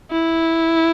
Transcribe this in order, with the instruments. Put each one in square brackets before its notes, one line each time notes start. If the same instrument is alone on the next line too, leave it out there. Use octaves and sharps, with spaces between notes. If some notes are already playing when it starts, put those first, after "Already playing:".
[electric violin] E4